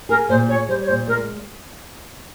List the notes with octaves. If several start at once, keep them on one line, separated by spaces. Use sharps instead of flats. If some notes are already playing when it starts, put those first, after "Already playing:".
G#4 A#4
A#2 C5
G#4 C#5
G3 C5
C#5
A#2 C5
G#3 A#4